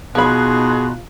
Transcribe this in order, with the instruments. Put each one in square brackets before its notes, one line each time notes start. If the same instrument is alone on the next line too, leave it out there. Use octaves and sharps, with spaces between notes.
[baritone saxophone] B2 [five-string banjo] F3 B5 [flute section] D#4 C6 F#6 [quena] G#4